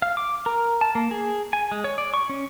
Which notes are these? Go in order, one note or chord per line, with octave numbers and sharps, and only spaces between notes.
F5
D6
A#4
A5
A#3
G#4
G#5
G#3
C#5
D5
C#6
C#4